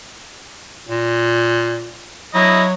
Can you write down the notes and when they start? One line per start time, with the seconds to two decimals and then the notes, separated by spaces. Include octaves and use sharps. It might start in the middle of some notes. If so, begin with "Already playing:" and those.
0.88 A#2
2.35 F#3 E4 D#5